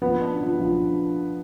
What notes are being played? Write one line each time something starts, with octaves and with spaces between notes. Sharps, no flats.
F3 B3
D4
F3
F3